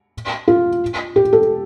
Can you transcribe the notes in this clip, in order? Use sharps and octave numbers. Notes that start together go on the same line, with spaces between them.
F4
G4
A4